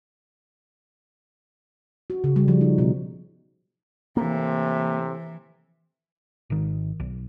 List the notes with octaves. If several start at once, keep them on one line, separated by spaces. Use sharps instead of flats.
F#4
C#3
G3
F3
D#4
B2
A2 C3 E3 A#3
G#1 D#3
B1